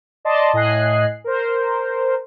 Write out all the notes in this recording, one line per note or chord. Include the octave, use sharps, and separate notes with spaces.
D5 D#5 A5 C6
A2 D#5 G#5 F#6 C7
A#4 C5